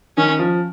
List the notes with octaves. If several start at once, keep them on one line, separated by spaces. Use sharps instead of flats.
D#3 C#4
F3